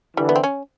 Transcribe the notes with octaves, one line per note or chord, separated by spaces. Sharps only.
D3 E3 G3
B3
C4
C#4